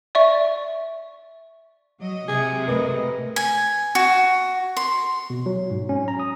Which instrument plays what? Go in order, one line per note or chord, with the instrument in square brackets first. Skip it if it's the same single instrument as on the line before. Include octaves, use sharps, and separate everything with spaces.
[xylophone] D5 E5 C#6
[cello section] F#3 D#5
[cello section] C3 G#3 [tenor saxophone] G#4
[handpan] A3 A#4 B4 [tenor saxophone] D#5
[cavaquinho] G#5
F#4
C6
[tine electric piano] B2
F#3
G#2
C#4
A#5
D#6